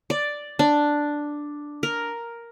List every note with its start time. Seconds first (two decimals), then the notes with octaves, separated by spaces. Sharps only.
0.10 D5
0.59 D4
1.83 A#4